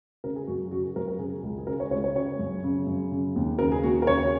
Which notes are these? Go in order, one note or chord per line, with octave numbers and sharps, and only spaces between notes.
C#3 A#4
G#4
F#2 F#4
C#3 F#4
G#4
F#2 A#4
A#4
C#3 G#4
C#2
G#4
C#3 A#4
C#5
C#2 C#5
C#5
C#3 C#5
F#2
C#3
F#2
C#3
D#2
C#3 A#4
G#4
D#2 F#4
A#4
C#3 C#5